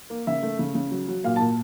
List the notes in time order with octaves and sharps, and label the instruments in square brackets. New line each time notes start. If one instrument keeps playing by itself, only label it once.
[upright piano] A#3
C#3 E5
A3
C#3
C#3
F#3
F#3
A#2 F5
A5
A#2